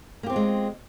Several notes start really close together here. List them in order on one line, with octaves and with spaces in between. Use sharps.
A#3 G4 C4 F4 G#3